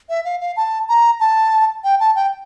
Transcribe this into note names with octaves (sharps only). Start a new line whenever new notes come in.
E5
F5
F5
A5
A#5
A5
G5
A5
G5